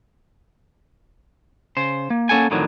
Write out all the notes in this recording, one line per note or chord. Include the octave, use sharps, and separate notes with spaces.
C#3 C5
A#3
A#3 C#4 A4 F#5 G#5
F2 A2 D3 D#3 F#3